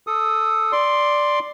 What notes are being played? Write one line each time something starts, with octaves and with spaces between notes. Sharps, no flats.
A4 D#6
D5 C6